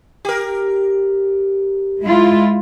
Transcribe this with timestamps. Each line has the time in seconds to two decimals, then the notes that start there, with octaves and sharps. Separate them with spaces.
0.25 G4 A#4
2.03 G#3 E4 F4